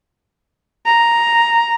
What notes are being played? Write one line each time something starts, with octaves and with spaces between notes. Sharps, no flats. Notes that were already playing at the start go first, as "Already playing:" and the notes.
A#5